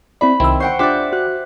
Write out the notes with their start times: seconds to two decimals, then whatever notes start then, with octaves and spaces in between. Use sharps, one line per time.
0.21 C4 E4 D5 B5
0.40 C2 D#3 C4 E4 E6
0.60 C5 F#5 G5 C#6
0.79 D4 F4 G4 C5 D5 E5 D6 F#6
1.13 F#4 F#6